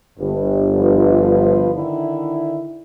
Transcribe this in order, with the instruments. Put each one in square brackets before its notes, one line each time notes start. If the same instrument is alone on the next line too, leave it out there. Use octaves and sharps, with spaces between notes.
[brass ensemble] G1 [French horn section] G2
[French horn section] F3 F4 B4
D3 D#3 E4